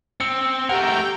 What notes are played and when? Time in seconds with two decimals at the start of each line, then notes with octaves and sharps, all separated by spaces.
0.20 C4 C#7
0.69 A3 G4 A#4 F#5 G5 A#5